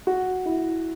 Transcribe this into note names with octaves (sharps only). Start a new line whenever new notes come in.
F#4
E4